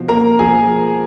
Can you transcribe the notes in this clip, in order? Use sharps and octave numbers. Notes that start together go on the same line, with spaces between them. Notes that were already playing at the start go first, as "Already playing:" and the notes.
Already playing: B2 F3
A#3 A#4 A#5
F3 G#4 G#5